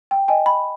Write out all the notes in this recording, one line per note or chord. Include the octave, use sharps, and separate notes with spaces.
G5
D#5 G5 G#5
B5